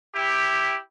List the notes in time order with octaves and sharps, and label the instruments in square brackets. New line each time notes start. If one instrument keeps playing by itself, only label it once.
[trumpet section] E4 G4